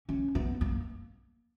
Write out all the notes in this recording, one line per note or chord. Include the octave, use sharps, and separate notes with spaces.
C#4
B3
A#3